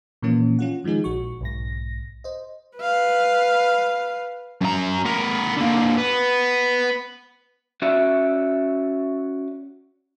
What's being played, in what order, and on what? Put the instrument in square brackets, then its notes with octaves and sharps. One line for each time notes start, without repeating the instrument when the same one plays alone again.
[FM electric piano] A#2 E3 F3 A#3 C#4
C#4 F4 F#5
D#3 F3 G#3 D#4 G#4
A#1 F#4 C#6
B1 G#2 A#6
C5 D#5
[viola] B4 F5
[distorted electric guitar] F#2 A#5
B3 A#4
D3 A#3
B3
[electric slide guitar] C#4 F#4 D5 E5